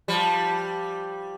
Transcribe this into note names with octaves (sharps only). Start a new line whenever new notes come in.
F3 G3